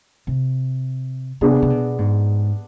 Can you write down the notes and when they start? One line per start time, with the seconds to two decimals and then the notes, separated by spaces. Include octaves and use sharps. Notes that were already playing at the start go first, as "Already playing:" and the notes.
0.27 C3
1.41 C3 B3 D4 G#4
1.62 C3
1.70 B2
1.98 G#2